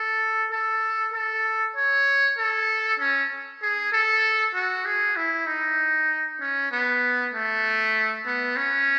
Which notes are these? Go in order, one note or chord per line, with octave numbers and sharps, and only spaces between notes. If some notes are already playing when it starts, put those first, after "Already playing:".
Already playing: A4
A4
A4
C#5
A4
C#4
G#4
A4
F#4
G#4
E4
D#4
C#4
B3
A3
B3
C#4